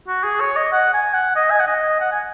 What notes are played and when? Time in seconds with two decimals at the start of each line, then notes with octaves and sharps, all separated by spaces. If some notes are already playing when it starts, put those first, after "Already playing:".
0.08 F#4
0.23 G#4
0.40 C#5
0.56 D#5
0.72 F#5
0.94 G#5
1.14 F#5
1.36 D#5
1.51 G#5
1.60 F#5
1.67 D#5
2.00 F#5
2.11 G#5